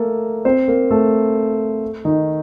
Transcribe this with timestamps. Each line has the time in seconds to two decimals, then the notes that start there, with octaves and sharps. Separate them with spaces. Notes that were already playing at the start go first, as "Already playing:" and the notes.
Already playing: A3 A#3 A4 A#4
0.45 C4 C5
0.68 A#3 A#4
0.91 A3 A4
2.05 D#3 D#4